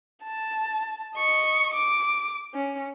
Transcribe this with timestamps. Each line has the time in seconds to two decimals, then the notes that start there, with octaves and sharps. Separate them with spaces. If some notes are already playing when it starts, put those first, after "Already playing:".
0.24 A5
1.16 D#5 C#6
1.73 D6
2.54 C#4